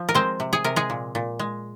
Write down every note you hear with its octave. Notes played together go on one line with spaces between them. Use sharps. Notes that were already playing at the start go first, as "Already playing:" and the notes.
Already playing: F3
A#4
G#3 C4 C5
C3
G#4
C3 A#4
G#3 G#4
A#2
A#2
G#3